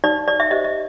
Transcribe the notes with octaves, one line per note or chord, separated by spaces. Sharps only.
D#4 D5
D5
E5
G4 C5 D#5
D#5